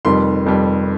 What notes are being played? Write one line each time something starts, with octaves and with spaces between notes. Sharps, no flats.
F1 F2 D#3 G3 C6
F1 F2 D#3 G3